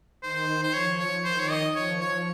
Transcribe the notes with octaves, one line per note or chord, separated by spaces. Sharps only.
D#3 C5
C5
F3 C#5
C#5
D#3 C5
C#5
D#5
F3 C#5
C#5